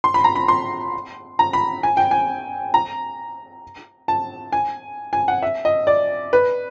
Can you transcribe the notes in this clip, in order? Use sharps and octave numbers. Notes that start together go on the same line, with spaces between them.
C6
B5
A#5
B5
C6
A#5
B5
G#5
G5
G#5
A#5
A5
G#5
G#5
F#5
E5
D#5
D5
B4